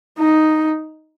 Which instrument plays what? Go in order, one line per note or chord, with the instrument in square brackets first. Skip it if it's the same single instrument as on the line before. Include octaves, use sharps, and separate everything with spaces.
[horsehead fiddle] D#4